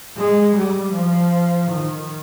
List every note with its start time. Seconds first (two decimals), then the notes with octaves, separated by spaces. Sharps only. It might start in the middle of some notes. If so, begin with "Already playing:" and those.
0.17 G#3
0.56 G3
0.94 F3
1.71 D#3